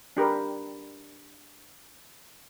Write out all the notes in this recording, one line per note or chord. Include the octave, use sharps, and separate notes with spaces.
D4 G4 A#4 B4